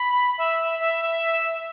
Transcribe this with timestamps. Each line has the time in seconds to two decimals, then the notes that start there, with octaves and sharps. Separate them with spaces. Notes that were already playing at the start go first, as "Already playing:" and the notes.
Already playing: B5
0.38 E5
0.80 E5